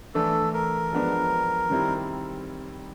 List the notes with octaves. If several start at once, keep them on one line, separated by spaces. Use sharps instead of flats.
E3 A3 D4 A4
A#4
F3 G#3 B3 D4
D#3 G3 C4 E4